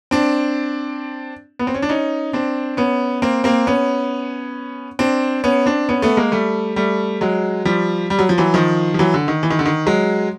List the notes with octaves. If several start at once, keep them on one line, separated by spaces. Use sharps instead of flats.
C4 D4
B3
C4
C#4
D4
C#4 D#4
C4 D4
B3 C#4
A#3 C4
A#3 C4
B3 C#4
C4 D4
B3 C#4
C4 D4
B3 C#4
A3 B3
G#3 A#3
G3 A3
G3 A3
F#3 G#3
F3 G3
G3
F#3
F3
E3 F#3
D#3 F3
F3
E3 F#3
D3
D#3
E3
D#3
D3
D#3
F#3 G#3